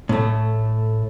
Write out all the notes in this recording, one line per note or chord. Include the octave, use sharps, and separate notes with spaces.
A2 A3